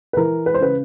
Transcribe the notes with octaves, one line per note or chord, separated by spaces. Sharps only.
B4
E3 A#4
B4
C5
C#3 B4